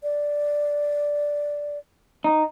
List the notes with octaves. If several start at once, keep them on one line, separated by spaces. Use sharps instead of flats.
D5
D#4